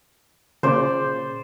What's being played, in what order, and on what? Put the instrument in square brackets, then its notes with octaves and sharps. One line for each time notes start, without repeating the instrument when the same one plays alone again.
[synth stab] A#2 C#3 [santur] C5 D5